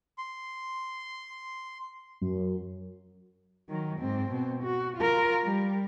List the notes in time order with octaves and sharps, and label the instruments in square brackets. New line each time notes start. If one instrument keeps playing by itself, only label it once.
[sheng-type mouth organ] C6
[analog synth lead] F#2
[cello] D#3 F#3
G#2 C4
B2 C4
F#4
F4 A#4
G3